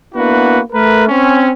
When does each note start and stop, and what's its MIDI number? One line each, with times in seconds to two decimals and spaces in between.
0.15 0.59 58
0.15 0.59 59
0.15 0.59 62
0.15 0.59 64
0.15 0.59 66
0.15 0.59 71
0.73 1.05 57
0.73 1.05 70
0.73 1.05 71
1.08 1.50 60
1.08 1.50 61